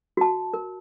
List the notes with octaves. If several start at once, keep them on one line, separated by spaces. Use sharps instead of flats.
F#4 A5
A#4